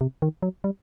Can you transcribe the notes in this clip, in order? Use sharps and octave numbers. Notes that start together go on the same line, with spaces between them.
C3
D#3
F#3
G3